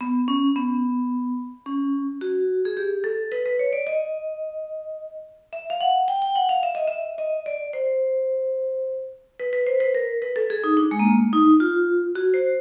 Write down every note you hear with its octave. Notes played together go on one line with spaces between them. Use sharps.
B3
C#4
B3
C#4
F#4
G#4
G4
A4
B4
B4
C#5
D5
D#5
E5
F5
F#5
G5
G5
F#5
F5
E5
D#5
E5
D#5
D5
C5
B4
B4
C5
B4
A#4
B4
A4
G#4
D#4
D4
G#3
A#3
A3
D#4
F4
F#4
C5